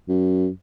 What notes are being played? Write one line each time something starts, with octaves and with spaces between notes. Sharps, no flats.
F#2